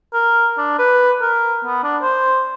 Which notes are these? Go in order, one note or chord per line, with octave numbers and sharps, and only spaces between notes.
A#4
D4
B4
A#4
B3
D4
C5